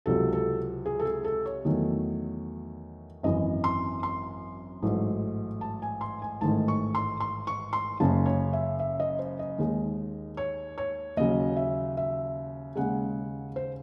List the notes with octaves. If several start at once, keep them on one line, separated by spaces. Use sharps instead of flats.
C#2 C3 F#3 A4
A4
G#4
A4
G#4
A4
C#5
E2 D#3 F#3 A3
G#1 F#2 E3 D#5
C6
C6
A1 G#2 F#3 A3
A5
G#5
C6
G#5
A1 G#2 D#3 A3 A5
C#6
C6
C6
C#6
C6
F#1 F#2 C#3 A5
C#5
E5
E5
D#5
C5
D#5
D#2 D#3 G#3
C#5
C#5
D#2 C#3 F#3 D#5
E5
E5
D#2 C#3 G#3 F#5
C5